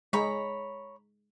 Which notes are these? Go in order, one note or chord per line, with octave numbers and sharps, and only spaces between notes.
G#3 C#5 A#5 B5